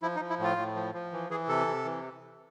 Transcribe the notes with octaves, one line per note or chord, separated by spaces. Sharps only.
F3 E4
D#4
F3
E4
A2 F4
A2
F3
F3
E3
E3 G#4
C3 A4
C3
E3